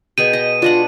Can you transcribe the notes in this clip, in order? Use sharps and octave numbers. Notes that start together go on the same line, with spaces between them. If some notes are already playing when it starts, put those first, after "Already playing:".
B2 G#4 G5 D#7
D#5
D4 F4 D#5 F#5